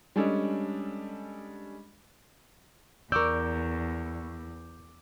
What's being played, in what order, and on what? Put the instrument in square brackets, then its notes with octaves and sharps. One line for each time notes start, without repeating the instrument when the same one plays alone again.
[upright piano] G3 G#3 C#4 D4 A4 D#5
[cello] E2 [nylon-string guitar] A#4 D5 [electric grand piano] C#6 D6 E6 [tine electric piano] G6